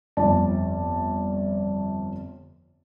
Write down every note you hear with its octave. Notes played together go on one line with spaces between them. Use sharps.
G1 F2 F3 D5 A5